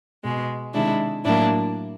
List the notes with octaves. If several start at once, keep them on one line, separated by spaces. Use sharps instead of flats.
B2 G#3
C3 D#3 G#3 D4 E4
A2 F#3 A#3 D4 E4